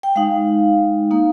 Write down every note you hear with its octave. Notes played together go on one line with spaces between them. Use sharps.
G5
G#3 D#4 F5
A#3 D#4